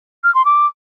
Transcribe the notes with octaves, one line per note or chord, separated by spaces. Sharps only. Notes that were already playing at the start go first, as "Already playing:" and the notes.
F6
C6
D6